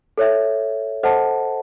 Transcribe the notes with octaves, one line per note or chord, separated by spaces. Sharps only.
A4 C#5 E5
A4 C5 D#5 F#5 A5